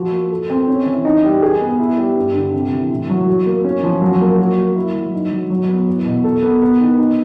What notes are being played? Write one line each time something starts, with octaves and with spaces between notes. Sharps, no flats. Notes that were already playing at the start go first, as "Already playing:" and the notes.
Already playing: F3 F#4
A#3
A4
C4
C#4
E3
D#4
G3
G#4
B3
E4
G3
G2
D3
C3
E3
A2
F#3
F#4
A#3
C#4
F3
F#3
A#3
F#4
A#3
E4
F#3
D#4
F#3
F#3
B3
E2
B2
A4
B3
B3
D#3
D#4